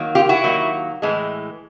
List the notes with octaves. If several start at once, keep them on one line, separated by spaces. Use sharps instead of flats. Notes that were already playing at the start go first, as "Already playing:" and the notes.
Already playing: D#3 F#3 A#3
F4 G4
E4 F#4
D#3 F#3 A#3
A2 E3 G#3